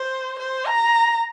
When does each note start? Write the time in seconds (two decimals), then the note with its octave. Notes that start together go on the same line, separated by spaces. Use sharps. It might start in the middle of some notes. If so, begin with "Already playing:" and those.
Already playing: C5
0.39 C5
0.67 A#5